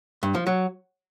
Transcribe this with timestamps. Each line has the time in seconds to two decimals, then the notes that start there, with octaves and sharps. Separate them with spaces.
0.23 G2
0.35 F3
0.47 F#3